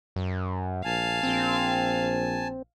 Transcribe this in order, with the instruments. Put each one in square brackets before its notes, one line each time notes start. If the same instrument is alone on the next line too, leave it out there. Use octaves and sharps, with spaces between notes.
[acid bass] F#2
[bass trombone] A#1 [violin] F5 [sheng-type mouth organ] G#5 A5
[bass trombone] A#1 [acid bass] C4